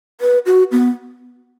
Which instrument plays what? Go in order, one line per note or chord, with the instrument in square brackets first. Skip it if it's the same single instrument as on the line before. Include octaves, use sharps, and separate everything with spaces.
[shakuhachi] B4
F#4
B3